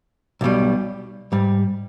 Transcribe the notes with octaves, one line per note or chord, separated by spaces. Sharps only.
B1 B2 G3
G#2 G3